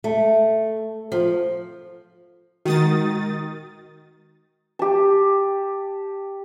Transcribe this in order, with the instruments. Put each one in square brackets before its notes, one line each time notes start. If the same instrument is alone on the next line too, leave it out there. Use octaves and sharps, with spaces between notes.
[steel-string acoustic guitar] A3
F3
[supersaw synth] D#3 D#6 A6 [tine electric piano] G#3 F#4
[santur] G4 A5